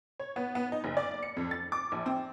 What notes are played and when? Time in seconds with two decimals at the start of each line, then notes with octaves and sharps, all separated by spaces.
0.20 C#5
0.36 B3
0.55 B3
0.72 D#4
0.84 F#1
0.97 D5
1.23 C#7
1.37 F2
1.51 A6
1.72 D6
1.92 A#1
2.06 C4